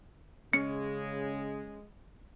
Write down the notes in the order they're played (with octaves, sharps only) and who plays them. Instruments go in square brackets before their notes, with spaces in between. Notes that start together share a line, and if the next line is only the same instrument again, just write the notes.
[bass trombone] C#3 [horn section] G#3 [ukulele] C#4 [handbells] C#7